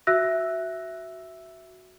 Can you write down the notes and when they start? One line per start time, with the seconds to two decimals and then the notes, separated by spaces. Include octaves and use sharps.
0.07 F#4 E5 E6 F#6 A#6